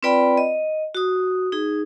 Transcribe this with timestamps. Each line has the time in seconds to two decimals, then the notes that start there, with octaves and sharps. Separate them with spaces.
0.03 C4 F4 B4 D5 G5 B5
0.37 D#5
0.95 F#4 D#6
1.52 D#4 G#4